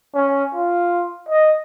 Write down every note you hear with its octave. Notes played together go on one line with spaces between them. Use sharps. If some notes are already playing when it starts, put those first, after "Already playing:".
C#4
F4
D#5